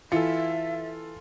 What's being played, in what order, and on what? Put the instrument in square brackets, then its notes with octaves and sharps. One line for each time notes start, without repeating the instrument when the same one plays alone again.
[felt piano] E3 C#7 [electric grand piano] F4 A4 [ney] E5